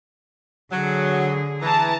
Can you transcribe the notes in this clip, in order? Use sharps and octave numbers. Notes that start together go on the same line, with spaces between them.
D3 F#3 G#4
E3 A5 A#5